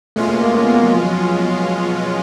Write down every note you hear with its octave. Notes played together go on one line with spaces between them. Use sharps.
B2 G#3 A3 C#4 F4
A#3
A#3
A#3
B3
A#3
F#3
F3
F#3